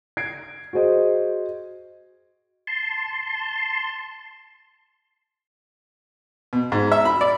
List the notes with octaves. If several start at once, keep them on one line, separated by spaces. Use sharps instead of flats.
G#6 C7 D7
F#4 G#4 C5 D#5
A5 C6
B2
G#2
E5
B5
D5